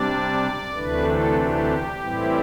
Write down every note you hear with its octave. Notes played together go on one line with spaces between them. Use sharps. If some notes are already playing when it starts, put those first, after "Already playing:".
Already playing: C3 G3 D4 D5
D2 C3 E3 A3 D4 B4
A4
G4
A2 E3 G3 C4 E4